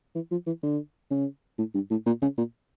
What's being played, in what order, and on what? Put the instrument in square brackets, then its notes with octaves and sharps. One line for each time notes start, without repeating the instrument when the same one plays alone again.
[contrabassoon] E3
F3
E3
D3
C#3
A2
G2
A2
A#2
C#3
A#2